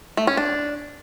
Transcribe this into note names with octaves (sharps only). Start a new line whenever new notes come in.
A3
C#4
D4